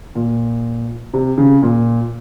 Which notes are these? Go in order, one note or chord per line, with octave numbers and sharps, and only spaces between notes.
A#2
C3
C#3
A#2